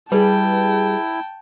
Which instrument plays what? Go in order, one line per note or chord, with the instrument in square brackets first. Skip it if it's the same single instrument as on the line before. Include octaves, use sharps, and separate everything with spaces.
[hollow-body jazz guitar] G3 [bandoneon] E4 [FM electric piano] G#4 B4 [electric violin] G5 A5